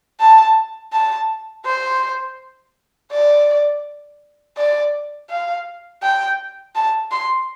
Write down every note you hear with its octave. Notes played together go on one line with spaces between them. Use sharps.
A5
A5
C5
D5
D5
F5
G5
A5
C6